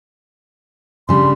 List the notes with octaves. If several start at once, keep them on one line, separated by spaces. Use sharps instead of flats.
C#3 G3 D4 C6